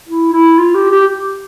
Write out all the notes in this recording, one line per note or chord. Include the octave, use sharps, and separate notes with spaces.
E4
E4
F4
G4
G4